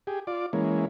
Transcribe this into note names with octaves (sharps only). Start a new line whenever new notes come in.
G4 G#4
F4 D5
E3 G#3 A#3 C#4